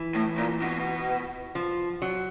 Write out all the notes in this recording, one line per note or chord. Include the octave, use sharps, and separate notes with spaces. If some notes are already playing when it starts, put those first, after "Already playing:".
Already playing: E3
A2
A#2
B2
F3
F#3